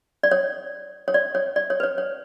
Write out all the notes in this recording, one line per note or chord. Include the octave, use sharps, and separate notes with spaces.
D5
C#5
C#5
D5
C#5
D5
C#5
B4
C#5
C#5